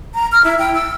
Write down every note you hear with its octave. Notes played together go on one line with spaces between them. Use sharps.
A#5
F6
E4
G5
E6